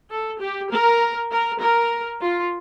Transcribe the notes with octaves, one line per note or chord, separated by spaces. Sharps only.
A4
G4
A#4
A#4
A#4
F4